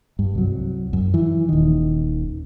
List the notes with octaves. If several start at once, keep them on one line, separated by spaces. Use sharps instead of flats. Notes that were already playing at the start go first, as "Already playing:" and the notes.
G2
C2 F#3
F#2
E3
D#1 D#3